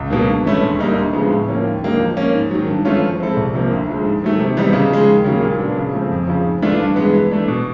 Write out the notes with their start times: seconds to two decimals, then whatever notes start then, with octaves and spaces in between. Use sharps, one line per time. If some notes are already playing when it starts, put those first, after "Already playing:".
Already playing: C#2
0.10 B2 F#3 A#3
0.28 G2
0.45 E3 A3 C#4 E4
0.63 D2
0.79 D3 G3 A#3 D#4
0.96 D2
1.13 C#3 F3 G#3 B3
1.30 A2
1.48 F3 A#3 C#4
1.65 D#2
1.82 D3 F#3 A#3 D#4
2.00 F3
2.17 A#3 C#4
2.33 G#2
2.51 D#3 F#3
2.68 G2
2.85 E3 A3 C#4 F4
3.01 F3
3.19 G#3 C4 E4 A4
3.37 C2
3.54 C3 F3 A#3
3.71 D2
3.88 D3 F3 G#3
4.05 G#2
4.22 D#3 F#3 A3
4.40 C3
4.57 E3 G3 B3 D#4
4.73 C#3
4.90 F3 G#3
5.07 D#2
5.24 C#3 F#3 A#3
5.42 A#2
5.59 F#3 B3 D4
5.76 C#3
5.93 F3 A3 C4
6.11 F2
6.28 C#3 F3
6.44 G#2
6.62 E3 A3 D4 F4
6.80 G2
6.96 E3 G#3 B3
7.13 E3
7.31 A3 D4
7.48 B2